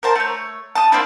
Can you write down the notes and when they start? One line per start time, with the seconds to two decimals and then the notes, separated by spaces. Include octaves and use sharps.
0.03 A#4 C5 A5
0.15 A3 C#5
0.75 A5 D#6
0.92 A#3 C4 D4 E4